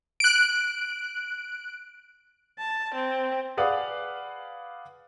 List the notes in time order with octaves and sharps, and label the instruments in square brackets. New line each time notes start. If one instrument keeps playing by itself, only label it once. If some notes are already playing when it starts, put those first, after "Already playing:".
[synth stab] F#6 D7
[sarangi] A5
C4
[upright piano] G#4 B4 D5 F5 F#5 D#6